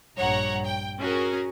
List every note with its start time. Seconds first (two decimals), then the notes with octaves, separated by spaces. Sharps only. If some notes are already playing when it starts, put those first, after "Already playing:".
0.18 A#1 G2 C#5 F#5 A#5
0.65 G5
0.99 C#4 F#4 G#4 A#4